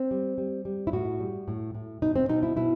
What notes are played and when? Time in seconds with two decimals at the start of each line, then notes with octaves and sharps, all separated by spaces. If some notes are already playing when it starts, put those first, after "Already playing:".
Already playing: C4
0.11 G3
0.38 G3
0.65 G3
0.87 E4
0.93 A2 F#4
1.20 G3
1.48 A2
1.74 A2
2.02 B2 D#4
2.16 C4
2.29 B2 D#4
2.43 E4
2.56 B2 E4